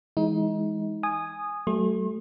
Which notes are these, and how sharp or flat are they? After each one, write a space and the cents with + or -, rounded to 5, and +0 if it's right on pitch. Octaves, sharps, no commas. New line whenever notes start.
E3 +0 G#3 +0 D#4 +30
G#5 +0 D#6 -15
F#3 +40 A3 +0 C6 +40